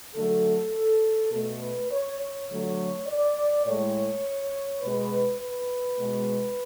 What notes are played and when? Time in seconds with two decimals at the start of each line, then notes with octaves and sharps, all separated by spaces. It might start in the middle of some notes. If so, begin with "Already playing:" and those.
0.15 D3 F#3 A3 A4
1.32 B2 A3 A4
1.61 B4
1.91 C#5
2.21 C#5
2.50 D3 F#3 A3
3.08 D5
3.66 A2 G#3 C#5
4.82 B2 G#3 B4
5.41 B4
5.99 B2 G#3